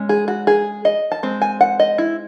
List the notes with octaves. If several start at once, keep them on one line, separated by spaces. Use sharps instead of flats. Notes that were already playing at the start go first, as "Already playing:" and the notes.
Already playing: G#3 C#4
G#4
F#4
G#4
D#5
A5
G#3 C4
G#5
F#5
D#5
E4